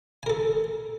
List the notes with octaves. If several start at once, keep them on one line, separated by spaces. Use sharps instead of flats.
A4 A#4 G#5